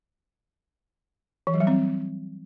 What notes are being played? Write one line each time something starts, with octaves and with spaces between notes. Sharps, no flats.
E3
F#3
G3
C4